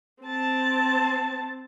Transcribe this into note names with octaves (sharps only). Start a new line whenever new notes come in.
C4 A5